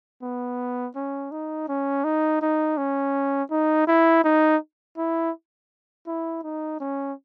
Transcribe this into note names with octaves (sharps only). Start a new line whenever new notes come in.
B3
C#4
D#4
C#4
D#4
D#4
C#4
D#4
E4
D#4
E4
E4
D#4
C#4